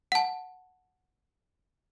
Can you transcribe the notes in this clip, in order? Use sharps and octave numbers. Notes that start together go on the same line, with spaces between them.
F#5 A5